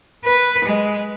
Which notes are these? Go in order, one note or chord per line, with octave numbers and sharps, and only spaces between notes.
B4
G#3